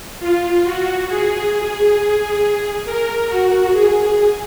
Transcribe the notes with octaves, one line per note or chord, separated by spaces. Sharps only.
F4
F#4
G#4
A#4
F#4
G#4
G#4